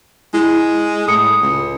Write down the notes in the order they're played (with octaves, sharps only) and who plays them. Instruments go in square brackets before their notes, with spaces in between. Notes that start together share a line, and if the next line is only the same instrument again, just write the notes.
[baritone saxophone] G#3 [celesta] E4
[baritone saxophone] A2 [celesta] D#6 C#7
[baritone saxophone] C#2